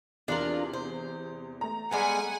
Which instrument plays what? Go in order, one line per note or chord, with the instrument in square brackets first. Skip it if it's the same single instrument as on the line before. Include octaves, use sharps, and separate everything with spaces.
[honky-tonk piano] E2 C3 F#7 [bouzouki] D4 F4 A#4
[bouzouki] C5
[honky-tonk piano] A3 A#5
[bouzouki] G3 G#3 B3 [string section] F#5 G#5